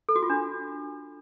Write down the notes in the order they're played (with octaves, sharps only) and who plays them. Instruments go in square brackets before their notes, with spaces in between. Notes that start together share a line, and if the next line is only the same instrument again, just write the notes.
[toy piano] A4
F#4
F4
D4